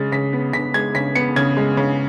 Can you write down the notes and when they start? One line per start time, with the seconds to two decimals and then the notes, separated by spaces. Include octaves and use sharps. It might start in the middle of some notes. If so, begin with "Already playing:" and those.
Already playing: C#3 G#3 A6
0.12 C#3 B6
0.33 B3
0.53 C#3 B6
0.74 G#3 G#6
0.95 C#3 B6
1.15 B3 C#7
1.36 C#3 G#6
1.57 G#3
1.77 C#3